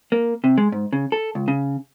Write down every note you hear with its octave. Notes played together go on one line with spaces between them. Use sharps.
A#3
C3
G#3
G#2
C#3
A4
C#2
C#3